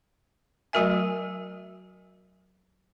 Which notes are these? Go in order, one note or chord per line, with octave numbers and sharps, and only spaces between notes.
F#3 A3 F#4 A#4 E5 G#5